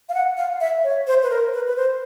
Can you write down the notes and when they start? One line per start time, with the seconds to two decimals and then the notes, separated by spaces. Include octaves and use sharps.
0.09 F5
0.14 F#5
0.37 F5
0.60 E5
0.84 C#5
1.07 C5
1.23 B4
1.30 A#4
1.53 B4
1.67 B4
1.76 C5